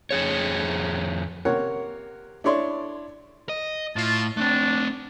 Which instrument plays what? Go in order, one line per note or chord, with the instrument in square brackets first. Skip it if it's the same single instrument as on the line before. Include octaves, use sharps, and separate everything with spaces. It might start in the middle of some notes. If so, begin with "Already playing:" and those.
[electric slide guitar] F2 G#4 C#5
[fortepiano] C3 A#3 A#4 C#5 F#5
D4 E4 A4 C#5 D5 C6
[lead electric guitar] D#5
[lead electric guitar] A2 [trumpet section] F4 A5
[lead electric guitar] A3 C4 [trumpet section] D4